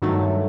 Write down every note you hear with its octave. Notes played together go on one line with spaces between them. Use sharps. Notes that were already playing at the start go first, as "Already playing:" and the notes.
G2 D#3 F#3 A3